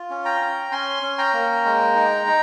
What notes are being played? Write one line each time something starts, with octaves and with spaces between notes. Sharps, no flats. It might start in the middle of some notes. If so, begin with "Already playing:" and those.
Already playing: F4
C#4
G5 A#5
C#4
C#4 G#5 C6
C#4
G5 A#5
A#3
G#3
D#4
D#4